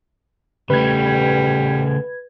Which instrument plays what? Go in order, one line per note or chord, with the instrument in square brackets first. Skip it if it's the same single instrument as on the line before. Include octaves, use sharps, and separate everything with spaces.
[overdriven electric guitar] C#3 A3 [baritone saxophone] G3 [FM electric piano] B4 G#6